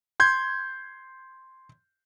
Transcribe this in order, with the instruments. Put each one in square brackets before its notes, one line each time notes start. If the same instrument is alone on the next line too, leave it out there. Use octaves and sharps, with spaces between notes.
[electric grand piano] C6 G6 G#6